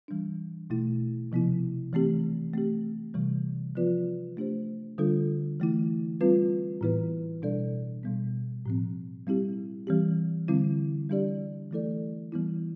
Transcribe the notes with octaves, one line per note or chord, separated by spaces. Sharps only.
E3 G3 D4
B2 A3 E4
C3 F3 B3 E4
E3 A3 C4 G4
A3 C4 G4
C3 E3 G3
F3 B3 F4 B4 D5
A3 D4 G4 C5
D3 G3 D4 F4 A4
E3 A3 E4
G3 C4 F4 B4
A2 E3 B3 E4 B4
B2 G3 D4 A4 D5
B2 G3 B3
A2 F3 C4
G3 C4 E4 G4
E3 G3 C4 G4
D3 G3 C4 E4
G3 D4 G4 D5
E3 A3 E4 A4 D5
E3 G3 B3 E4